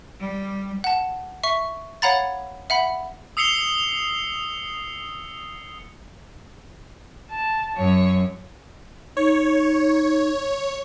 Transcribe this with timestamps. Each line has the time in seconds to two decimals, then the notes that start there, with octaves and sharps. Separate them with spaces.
0.20 G3
0.84 F#5 A5
1.43 E5 C#6
2.02 C#5 F5 F#5 A#5 B5 A6
2.70 E5 F#5 B5
3.37 D#6 E6 C7 C#7 F7 G7
7.30 A5
7.77 F#2 C#5
9.17 D#4 C#5